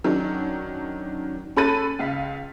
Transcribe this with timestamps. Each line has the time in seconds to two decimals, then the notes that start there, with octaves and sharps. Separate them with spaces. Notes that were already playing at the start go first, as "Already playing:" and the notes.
0.04 D#3 F#3 C#4 D4
1.57 C#4 A4 B5 F#6 A6 D#7
1.99 C#2 F5 B6